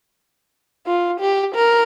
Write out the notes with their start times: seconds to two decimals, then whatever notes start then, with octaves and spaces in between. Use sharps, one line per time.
0.87 F4
1.20 G4
1.55 A#4